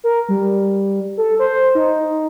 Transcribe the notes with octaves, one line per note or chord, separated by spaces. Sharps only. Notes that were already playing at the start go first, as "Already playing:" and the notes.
A#4
G3
A4
C5
D#4